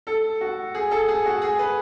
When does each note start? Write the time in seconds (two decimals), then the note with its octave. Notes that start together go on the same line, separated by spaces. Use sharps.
0.07 A4
0.41 F#4
0.75 G#4
0.91 A4
1.08 G#4
1.25 F#4
1.42 G#4
1.59 B4